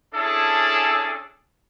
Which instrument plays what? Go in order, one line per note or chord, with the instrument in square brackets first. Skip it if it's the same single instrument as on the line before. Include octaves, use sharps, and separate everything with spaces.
[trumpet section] C#4 D4 E4 G#4 A4